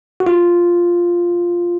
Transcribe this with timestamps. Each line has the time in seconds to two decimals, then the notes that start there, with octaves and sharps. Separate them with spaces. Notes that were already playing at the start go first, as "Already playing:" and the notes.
0.20 F#4
0.27 F4